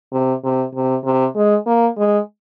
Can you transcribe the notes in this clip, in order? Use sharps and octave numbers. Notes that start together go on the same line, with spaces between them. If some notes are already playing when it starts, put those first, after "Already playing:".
C3
C3
C3
C3
G#3
A#3
G#3